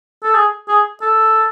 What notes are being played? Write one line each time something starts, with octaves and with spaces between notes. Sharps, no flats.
A4
G#4
G#4
A4